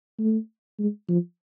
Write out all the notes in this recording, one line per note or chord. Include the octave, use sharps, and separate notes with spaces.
A3
G#3
F3